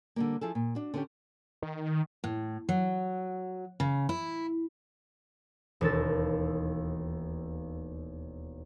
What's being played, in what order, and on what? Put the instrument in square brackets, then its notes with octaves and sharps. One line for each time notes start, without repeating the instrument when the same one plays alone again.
[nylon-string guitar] D3 G3 A#3
F3 E4 G#4 A4
A#2
D4 F#4
D3 B3 C#4 G4
[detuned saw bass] D#3
[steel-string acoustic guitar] A2
F#3
C#3
E4
[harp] E1 D#2 A4 A6